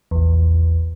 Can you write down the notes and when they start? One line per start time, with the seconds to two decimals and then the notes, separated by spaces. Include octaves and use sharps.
0.11 A#1 E2